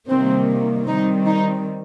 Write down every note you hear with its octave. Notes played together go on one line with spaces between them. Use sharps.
C3 D#3 G3 A#3 C4
D#3 G3 C4 D#4
D#4